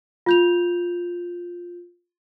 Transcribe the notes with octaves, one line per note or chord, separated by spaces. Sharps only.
F4 G6 F7